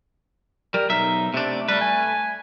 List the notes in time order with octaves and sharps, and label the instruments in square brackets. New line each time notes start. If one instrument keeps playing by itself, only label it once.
[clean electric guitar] G3 [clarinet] A#4
[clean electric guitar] B1 E5 [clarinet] D#4
[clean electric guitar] C3 D4 [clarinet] A3
[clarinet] G3 [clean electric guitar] A3 B4
[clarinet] G#5